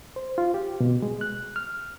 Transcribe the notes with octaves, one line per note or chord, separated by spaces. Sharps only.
C5
F4
G4
B2
G#3
F#6
F6